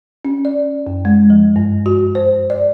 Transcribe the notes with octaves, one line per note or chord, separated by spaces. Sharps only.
C#4
D5
F#2
G#3
F3
G2
F#4
C5
D5